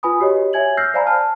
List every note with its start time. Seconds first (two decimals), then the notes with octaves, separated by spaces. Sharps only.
0.03 F4 B4 G#5 B5 D#6
0.20 F#4 G4 C#5 D#5
0.53 C#5 E5 G#5 G#6 F#7
0.77 E6 F6 G6 A#6 C7
0.94 C5 D5 F5 G#5 A#5 B5
1.07 A5 F6